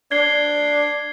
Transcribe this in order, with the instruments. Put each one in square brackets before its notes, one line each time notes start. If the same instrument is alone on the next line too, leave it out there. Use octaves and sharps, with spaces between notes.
[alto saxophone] D4 [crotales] G#6 C7 G7